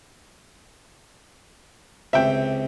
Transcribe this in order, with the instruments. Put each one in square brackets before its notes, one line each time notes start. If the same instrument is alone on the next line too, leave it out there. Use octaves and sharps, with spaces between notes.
[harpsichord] C#2 C3 [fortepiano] E5 G5